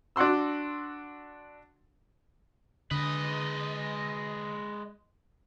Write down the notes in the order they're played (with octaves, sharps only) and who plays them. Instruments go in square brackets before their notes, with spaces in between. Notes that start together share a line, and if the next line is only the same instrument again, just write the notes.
[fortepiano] D4 F#4 F#5 C6 E6
[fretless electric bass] D3 [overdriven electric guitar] G#3 B4 [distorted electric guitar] D#5